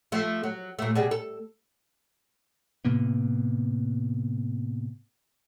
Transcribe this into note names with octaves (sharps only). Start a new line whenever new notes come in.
F3 A3
F#3
A#2 A3
B2 G3 G#4
A4
A2 C3 A#3 B3